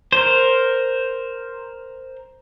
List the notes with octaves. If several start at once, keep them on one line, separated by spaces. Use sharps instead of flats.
A#4 C5